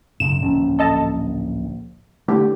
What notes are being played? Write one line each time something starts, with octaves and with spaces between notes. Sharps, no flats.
F#1 G#2 E7
D1 A#1 C#4
A4 D#5 A5
D3 E3 A3 G4